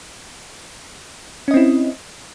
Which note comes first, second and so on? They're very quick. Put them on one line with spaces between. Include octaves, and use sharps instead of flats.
C#4 D#5 C4 E4